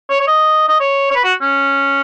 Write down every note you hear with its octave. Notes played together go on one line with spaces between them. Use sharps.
C#5
C#5
D#5
D#5
C#5
C#5
B4
F#4
C#4